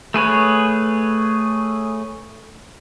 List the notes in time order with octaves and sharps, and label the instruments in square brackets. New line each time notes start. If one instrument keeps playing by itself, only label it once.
[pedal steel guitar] A3 G#4 B4 C#5